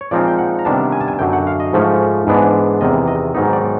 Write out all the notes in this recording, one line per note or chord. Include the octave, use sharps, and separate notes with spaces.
C#5
A#2 F3 G#3 C4 D#4 D5
G5
F#5
A#5
C3 D#3 G3 B3 D4 A5
G#5
A5
G#5
F#2 D3 F#3 G5
F#5
F5
D#5
G#2 F3 A3 C#4
G#2 E3 G#3 B3 D4
E2 C3 D#3 D#5
D#5
G#2 D#3 F#3 B3 D#4
D5